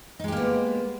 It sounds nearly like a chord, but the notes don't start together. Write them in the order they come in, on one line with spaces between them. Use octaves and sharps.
D#4 G#3 G4 A#3 B3